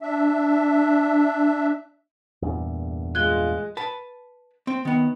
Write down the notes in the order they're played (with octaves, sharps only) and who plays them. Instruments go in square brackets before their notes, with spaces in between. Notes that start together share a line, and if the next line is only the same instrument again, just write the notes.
[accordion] D4 E5
[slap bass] E2 G2 A#2
[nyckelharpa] G#3 [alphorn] F4 [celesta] F#6 G#6 G7
[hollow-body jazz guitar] B4 A5
C4
D#3 B3